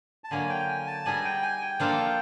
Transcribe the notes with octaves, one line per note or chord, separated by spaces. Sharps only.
A5
D3 F#3 A#3 G#5
G5
G#5
A5
G3 B3 D#4 G#4 G#5
G5
G#5
G5
F3 A#3 D4 F4 A4